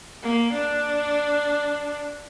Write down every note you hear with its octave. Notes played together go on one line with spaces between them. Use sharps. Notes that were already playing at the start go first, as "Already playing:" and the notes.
A#3
D4